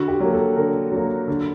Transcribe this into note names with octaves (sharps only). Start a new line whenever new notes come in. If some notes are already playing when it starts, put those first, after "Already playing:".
Already playing: D3 F#4
G4
F#3 A#3
A4
D3 A#4
F#3 A#3
D3